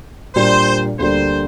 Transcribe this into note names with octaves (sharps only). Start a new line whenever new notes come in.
A#2 G3 D4 C5
D2 D3 G3 A#3 C5